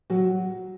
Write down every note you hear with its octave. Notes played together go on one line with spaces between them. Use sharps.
F#3 F#4